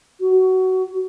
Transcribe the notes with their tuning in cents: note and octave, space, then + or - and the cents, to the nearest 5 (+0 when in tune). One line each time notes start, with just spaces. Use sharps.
F#4 +15